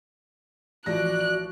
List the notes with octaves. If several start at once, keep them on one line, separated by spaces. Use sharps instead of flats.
A1 F3 F#4 D5 F#6 A#6